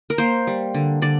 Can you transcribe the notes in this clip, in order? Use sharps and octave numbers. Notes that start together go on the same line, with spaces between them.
A#4
A#3 C5
G3
D3
D3 D5